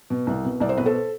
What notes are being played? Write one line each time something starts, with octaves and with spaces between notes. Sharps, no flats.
B2
C2
B2
C2 D5
C5
B2 B4
A4 C5